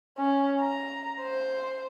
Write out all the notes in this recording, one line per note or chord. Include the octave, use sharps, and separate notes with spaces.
C#4
A#5
C5